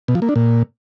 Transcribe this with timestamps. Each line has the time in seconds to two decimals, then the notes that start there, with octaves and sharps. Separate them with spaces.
0.08 B2
0.15 F3
0.22 A#3
0.29 D4
0.36 A#2